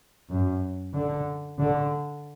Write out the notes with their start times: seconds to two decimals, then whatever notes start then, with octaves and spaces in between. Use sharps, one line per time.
0.29 F#2
0.94 D3
1.59 D3